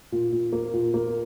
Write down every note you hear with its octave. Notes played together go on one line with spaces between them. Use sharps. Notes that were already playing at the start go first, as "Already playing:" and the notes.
A#2
A#2
A#3
A#2
A#3